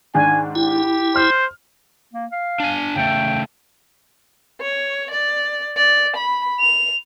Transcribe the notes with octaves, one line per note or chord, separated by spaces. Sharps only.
G#2 D#3 D4 G#5
E4 G4
C5 F6
A#3
F5
D4 G#5
C#3 A3 G5
C#5
D5
D5
B5
F7